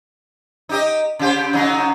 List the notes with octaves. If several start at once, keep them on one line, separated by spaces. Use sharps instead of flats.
D#4 G4 D#5
C#3 G4 C5
C#3 F#3 D#4